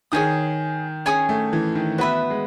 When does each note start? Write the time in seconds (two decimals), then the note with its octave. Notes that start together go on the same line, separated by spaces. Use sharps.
0.12 D#3 G#4 C#5 G#5 D#6
1.06 C#4 G#4 C#5 G#5 D#6
1.29 A3
1.53 E3
1.75 D#3
1.98 B3 F#4 B4 E5
2.30 G#3